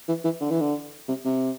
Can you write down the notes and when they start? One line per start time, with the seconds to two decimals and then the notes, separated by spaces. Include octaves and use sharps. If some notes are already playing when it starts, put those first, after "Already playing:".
0.08 E3
0.25 E3
0.41 D3
0.51 E3
0.61 D3
1.08 C3
1.25 C3